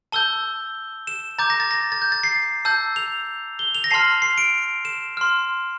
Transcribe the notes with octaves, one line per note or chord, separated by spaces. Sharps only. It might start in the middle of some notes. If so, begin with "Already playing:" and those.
A5 E6 G6 G7
E7
A#5 D6 G6 A6
A#6
A6
A#6
A6
G6
A6
C7
A5 E6 G6
F7
G7
F7
A#6
A5 C6 F6 C7
C7
D7
E7
C6 F6